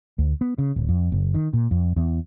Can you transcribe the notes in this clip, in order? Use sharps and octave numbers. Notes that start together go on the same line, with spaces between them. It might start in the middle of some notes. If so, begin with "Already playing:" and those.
D2
B3
C#3
D1
F2
F#1
D#3
A#2
F2
E2